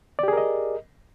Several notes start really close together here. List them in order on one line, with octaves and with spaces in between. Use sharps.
D5 G4 G#4 A#4 D#5